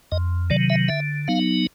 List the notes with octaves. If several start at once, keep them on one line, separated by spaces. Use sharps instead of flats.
F2 D#5
C3 D#3 F#3 D5
E5
D3 E5
F#3 B3 D#4 F5